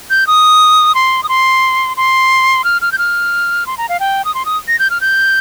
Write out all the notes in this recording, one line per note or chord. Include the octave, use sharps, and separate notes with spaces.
G6
D#6
C6
D#6
C6
C6
F6
F6
G6
F6
C6
A#5
F5
G5
D#6
C6
D#6
A#6
G6
F6
G6